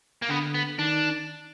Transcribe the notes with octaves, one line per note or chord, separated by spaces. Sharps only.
A#3
D3 B3
B3
D#3 D4